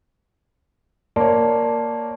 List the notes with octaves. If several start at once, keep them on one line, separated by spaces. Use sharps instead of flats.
A#3 C#5 D5 A5 C6